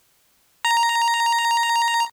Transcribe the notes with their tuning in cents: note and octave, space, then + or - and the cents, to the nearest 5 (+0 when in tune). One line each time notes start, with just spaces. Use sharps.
A#5 +0